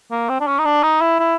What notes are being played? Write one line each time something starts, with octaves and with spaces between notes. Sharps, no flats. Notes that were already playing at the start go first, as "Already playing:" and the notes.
A#3
C4
D4
C#4
D#4
D4
D#4
E4
E4